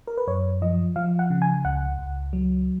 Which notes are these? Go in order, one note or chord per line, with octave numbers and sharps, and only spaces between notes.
A#4
B4
F#2 C#5
F3 D#5
F3 F5
F#5
C#3
G#5
C#2 F#5
C#2
F#3